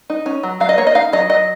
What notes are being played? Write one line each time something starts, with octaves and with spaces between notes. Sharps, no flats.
D#4
C#4
F#3
F#3 F5
D#5
A#3 C#5
D#5
D#4 F5
F#3 D#5
F#3 D#5